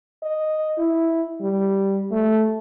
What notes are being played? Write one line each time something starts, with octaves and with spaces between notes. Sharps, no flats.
D#5
E4
G3
A3